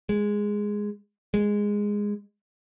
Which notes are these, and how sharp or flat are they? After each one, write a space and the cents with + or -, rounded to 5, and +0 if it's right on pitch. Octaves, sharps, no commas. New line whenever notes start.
G#3 -5
G#3 -10